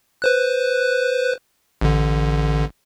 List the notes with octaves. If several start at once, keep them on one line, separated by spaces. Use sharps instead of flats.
B4 C5 F#6
A1 D3